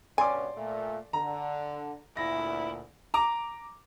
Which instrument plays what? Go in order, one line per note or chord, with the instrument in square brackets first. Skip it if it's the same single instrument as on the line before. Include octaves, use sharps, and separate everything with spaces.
[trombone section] G2 B2 C#4 [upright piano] D5 C6 D6 [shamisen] G#5
[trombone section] A#2 A3
[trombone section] D3 [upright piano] A#5
[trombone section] D2 A#2 [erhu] E4 [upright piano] A#6
[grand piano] A#5 D6